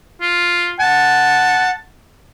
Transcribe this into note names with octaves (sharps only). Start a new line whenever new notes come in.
F4
F#5 A5